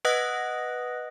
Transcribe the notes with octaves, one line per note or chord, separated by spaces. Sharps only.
B4 D#5 F#5 D#6 F#6 A#6